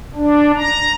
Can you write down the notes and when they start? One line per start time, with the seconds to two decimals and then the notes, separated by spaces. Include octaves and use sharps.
0.16 D4
0.56 A#5